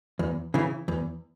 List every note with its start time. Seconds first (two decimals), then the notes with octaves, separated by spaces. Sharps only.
0.19 E2
0.54 C#3 E3
0.88 E2